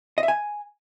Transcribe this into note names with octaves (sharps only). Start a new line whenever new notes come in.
D#5
E5
G#5